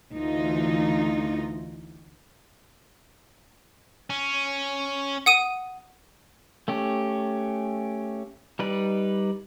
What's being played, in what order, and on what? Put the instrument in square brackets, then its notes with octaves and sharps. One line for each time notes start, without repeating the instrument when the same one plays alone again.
[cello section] D2 E3 D#4 F4
[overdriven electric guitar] C#4
[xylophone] F#5 D#6 D#7
[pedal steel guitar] A3 C#4 G4
G3 D#4 B4 D5